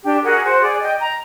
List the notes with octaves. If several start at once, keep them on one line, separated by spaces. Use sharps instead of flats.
D4 G4
F#4 G#4 A#4
F#4 C5
G#4 D5
D#5 G5
A#5